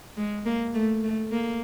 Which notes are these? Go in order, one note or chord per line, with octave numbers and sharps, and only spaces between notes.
G#3
A#3
A3
A3
A#3